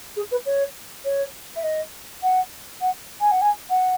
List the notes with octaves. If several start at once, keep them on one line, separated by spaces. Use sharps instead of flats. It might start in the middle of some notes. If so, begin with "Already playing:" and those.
G#4
B4
C#5
C#5
E5
D#5
F#5
F#5
G#5
F#5
G#5
F#5